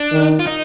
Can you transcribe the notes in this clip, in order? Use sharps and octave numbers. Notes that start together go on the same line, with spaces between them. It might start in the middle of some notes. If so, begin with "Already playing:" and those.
Already playing: D4
D#3
F4
D#4